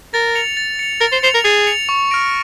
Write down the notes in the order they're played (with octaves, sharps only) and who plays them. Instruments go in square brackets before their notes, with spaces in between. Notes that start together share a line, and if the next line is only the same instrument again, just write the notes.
[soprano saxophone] A#4 [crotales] A6
[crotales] C#7 F7
A6
C#7 F7
[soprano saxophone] A#4 [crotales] A6
[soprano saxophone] C5
[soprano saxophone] C5 [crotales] C#7 F7
[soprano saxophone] A#4
[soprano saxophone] G#4 [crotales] A6
[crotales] C#7 F7
C#6
F6 A#6 D7